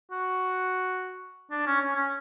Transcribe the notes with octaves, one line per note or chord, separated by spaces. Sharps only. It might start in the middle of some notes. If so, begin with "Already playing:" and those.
F#4
D4
C#4
C#4
C#4